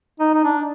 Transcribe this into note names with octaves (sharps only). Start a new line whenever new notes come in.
D#4
D#4
D4